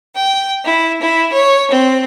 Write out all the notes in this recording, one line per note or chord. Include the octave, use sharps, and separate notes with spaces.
G5
E4
E4
C#5
C4